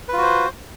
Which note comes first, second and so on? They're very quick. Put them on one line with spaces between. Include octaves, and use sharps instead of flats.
B4 F4 F#4 C5